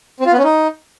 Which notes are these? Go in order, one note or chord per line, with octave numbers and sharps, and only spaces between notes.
C4
F4
B3
C#4
D#4